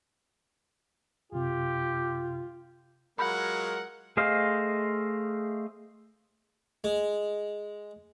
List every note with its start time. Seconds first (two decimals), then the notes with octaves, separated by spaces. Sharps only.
1.32 F#2 C3 F4 G4
3.19 F#3 G#3 F4 A#4 F#5 B5 G6
4.17 A3 G#4 C5 D#5 F5
6.84 G#3